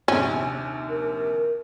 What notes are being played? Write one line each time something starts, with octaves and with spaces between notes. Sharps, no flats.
A#1 D#2 C3 C#4
A#4